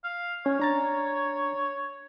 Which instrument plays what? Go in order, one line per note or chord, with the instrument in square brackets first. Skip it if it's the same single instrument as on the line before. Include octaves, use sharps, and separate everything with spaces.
[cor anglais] F5
[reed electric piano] C#4 [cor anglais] C#5
[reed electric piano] D4 A#5 A6